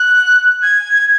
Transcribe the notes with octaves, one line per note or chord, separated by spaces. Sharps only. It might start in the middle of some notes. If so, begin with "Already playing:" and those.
Already playing: F#6
G#6